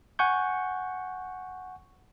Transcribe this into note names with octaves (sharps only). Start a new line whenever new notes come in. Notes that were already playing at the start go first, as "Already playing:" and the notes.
F#5 G#5 C#6 G6